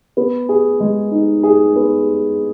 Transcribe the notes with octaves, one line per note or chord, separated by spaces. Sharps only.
B3
G#4
G#3
D#4
G#4
B3